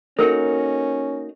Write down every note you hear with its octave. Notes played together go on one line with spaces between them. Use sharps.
A#3 C#4 D#4 F#4 A4 A#4